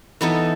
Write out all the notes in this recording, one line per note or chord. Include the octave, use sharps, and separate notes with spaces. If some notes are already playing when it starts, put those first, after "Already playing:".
E3 B3 D#4 A4